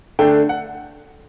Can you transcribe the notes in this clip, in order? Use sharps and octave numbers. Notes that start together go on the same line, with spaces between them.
D3 A3 D4 G5
F#5